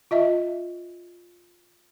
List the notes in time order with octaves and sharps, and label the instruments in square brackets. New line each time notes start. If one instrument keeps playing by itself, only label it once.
[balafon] F4 D#5 E5